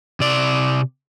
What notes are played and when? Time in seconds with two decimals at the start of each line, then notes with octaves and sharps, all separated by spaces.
0.20 C3 D5